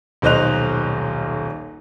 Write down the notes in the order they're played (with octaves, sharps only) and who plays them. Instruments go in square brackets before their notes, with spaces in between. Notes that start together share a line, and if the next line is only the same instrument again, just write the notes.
[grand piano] D#1 B1 C5 D#5 F#6 F7